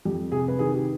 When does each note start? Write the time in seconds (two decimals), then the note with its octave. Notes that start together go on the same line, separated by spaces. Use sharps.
0.05 F2 G4
0.32 C3 G#4
0.48 B4
0.59 D#3 G#4
0.74 G4